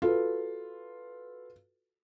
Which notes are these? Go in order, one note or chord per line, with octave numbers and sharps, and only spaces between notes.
F4 F#4 A4 B4